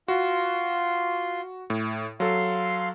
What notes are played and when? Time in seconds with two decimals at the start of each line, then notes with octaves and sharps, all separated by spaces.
0.08 F4 F#4 C6
1.70 A2
2.20 F#3 A4 F5 C6